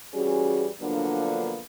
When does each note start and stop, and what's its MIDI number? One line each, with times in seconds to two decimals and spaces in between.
0.14 0.69 52
0.14 0.69 55
0.14 0.69 61
0.14 0.69 66
0.14 0.69 68
0.81 1.59 50
0.81 1.59 53
0.81 1.59 54
0.81 1.59 58
0.81 1.59 59
0.81 1.59 62